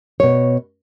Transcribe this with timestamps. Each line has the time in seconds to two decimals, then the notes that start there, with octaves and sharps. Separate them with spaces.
0.20 B2 C#5